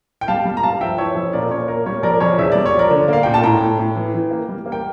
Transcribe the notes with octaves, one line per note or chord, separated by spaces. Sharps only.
G5
G3 F5 A5
G3
A#5
G2 F5 A5
F3 E5 G5
E3 C#5 E5
F2
A#2 A#4 D5
A#2 C#5
A#3 A#4
G3 C#5
F2 A#4 D5
F2 C#5
E2 E5
G3 D5
C#5
F3
A#4 D5
D3
A#3 F5
A#2 G5
A5
A2 G5 A#5
A2
A2
E3
E3
A#3
G3
A#3
G5